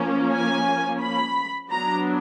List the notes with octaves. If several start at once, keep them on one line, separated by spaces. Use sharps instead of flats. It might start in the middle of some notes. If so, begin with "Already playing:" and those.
Already playing: F3 A#3 C#4
G#5
B5
F#3 B3 D4 A#5